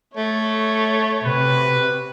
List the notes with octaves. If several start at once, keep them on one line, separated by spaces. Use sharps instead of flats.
A3 C#5
C3 F#4 B4